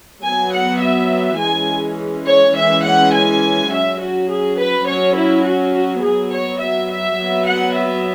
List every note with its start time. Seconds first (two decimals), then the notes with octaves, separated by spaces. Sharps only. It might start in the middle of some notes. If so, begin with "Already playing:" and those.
0.23 F#3 B3 G#5
0.53 F#5
0.82 E5
1.39 E3 G#3 C#4 G#5
2.27 C#5
2.56 E3 G#3 C#4 E5
2.84 F#5
3.14 G#5
3.72 F#3 C#4 E5
4.00 F#4
4.30 G#4
4.58 B4
4.87 F#3 C#4 C#5
5.16 E4
5.45 F#4
5.74 F#4
6.02 F#3 B3 G#4
6.32 C#5
6.61 E5
6.90 E5
7.19 F#3 B3
7.47 F#5
7.76 E5